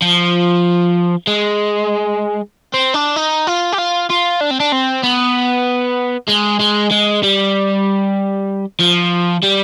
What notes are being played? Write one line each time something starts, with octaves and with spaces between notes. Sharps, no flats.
F3
G#3
C4
D4
D#4
F4
G4
F4
F4
D4
C4
D4
C4
B3
G#3
G#3
G#3
G3
F3
G3